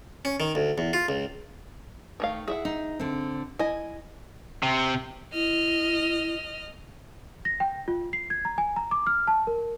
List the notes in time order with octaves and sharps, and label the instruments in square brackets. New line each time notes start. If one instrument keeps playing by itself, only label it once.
[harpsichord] C#4
D#3
D2
E2
F4
C#2
[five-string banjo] D#3 A3 F5
[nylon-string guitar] E4 [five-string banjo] G#4 E5 F#5
[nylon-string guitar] D#4
D3 C4
[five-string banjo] E4 D#5 [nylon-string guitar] G#5
[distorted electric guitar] C3
[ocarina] E4 [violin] D#5 F6
[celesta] A#6
G5
F4
C7
G#6
A#5
G#5
A#5
D6
F6
A5
A#4